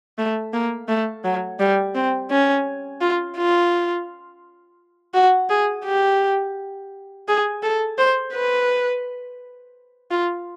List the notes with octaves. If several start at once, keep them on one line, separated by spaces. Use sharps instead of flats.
A3
A#3
A3
F#3
G3
C4
C#4
F4
F4
F#4
G#4
G4
G#4
A4
C5
B4
F4